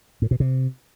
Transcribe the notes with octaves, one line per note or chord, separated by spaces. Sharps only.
A2
B2
C3